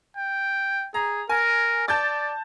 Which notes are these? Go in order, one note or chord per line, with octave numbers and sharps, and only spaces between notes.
G5
G#4 A#5
A#4 G#5
D5 A5 G6 A6